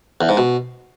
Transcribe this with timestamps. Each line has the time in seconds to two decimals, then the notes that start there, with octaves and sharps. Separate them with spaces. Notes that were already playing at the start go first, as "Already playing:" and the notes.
0.21 E2
0.29 G#2
0.37 B2